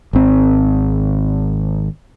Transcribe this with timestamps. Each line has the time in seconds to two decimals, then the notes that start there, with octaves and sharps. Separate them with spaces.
0.13 G#1 C4